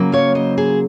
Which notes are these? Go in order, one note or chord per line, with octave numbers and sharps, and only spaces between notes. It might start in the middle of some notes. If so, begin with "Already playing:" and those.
Already playing: C#3 F#3 A#3
C#5 F5
C5 D#5
G#4 C5